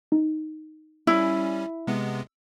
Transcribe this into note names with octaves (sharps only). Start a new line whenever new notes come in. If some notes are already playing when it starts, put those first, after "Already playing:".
D#4
G3 C#4 E4
C3 G#3 B3